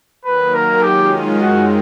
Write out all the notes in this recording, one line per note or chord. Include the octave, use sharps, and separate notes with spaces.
D#3 F#3 A#3 B4
A#4
D#3 G#3 C#4 F4 G4
F#2 D#3 G#3 C4 F#4